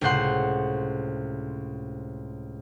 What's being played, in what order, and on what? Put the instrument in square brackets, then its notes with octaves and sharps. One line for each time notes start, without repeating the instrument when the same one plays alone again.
[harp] C#2 A2 C3 C5 F#5 C6